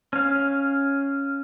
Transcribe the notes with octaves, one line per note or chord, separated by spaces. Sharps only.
C#4 F5